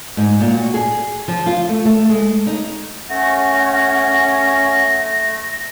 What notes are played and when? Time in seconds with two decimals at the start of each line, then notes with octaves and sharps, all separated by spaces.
0.17 G#2
0.40 A#2
0.54 F#4
0.74 G#4
1.28 F3
1.46 F4
1.69 A3
1.85 A3
2.09 G#3
2.47 D#4
3.09 A3 C#4 F#5 A#6